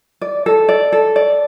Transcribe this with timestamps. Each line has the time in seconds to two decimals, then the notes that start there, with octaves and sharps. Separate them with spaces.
0.21 D5
0.46 A4
0.69 D5
0.92 A4
1.16 D5